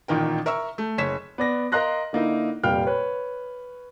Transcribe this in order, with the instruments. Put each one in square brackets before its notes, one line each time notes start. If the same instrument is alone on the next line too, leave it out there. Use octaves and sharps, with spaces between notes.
[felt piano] A1 A#2 D#3 A#4 G5
A#4 E5 C#6 E6
A3
F#1 C#5 B6 E7
[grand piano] B3 D5 A#6
A#4 D#5 F5 C6 F#6 A#6
D3 A#3 D#4 E4
F1 A#2 G3 F5 G5 F6
B4 C#5